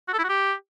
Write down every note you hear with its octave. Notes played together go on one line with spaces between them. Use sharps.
F#4
A4
E4
F#4
G4